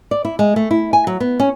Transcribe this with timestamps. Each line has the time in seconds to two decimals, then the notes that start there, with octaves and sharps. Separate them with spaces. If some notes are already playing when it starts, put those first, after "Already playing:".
0.11 D5
0.25 E4
0.39 G#3
0.56 A3
0.71 E4
0.93 G#5
1.07 F#3
1.20 B3
1.40 C#4